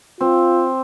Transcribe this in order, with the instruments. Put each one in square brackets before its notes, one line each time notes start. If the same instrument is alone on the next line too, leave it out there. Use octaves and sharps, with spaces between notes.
[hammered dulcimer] C4 [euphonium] F4